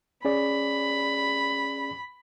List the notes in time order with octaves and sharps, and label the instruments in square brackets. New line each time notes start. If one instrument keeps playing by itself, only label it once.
[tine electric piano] C#4 G#4 D5 [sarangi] B5